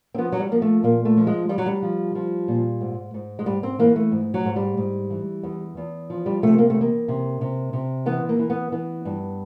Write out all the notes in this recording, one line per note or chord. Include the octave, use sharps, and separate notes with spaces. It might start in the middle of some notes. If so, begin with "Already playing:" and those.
C4
F3 B3
F#3
G3
F3 A#3
A3
A#2 A#3
A3
F3
G#3
F3 G3
F#3
G3
F3
F3
A#2
G#2
G#2
G#3
G#2 G3
C4
E3 A#3
A3
G#2
F#3
G#2
G3
G#2
E3
E2
E2
F3
G3
C3 A3
A#3
E2 A3
A#3
C3
C3
C3
E3 B3
A#3
E3
B3
E3 B3
G2